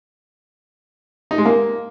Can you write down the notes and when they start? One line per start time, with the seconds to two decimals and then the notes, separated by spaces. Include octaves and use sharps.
1.31 D#4
1.38 G#3
1.46 A#3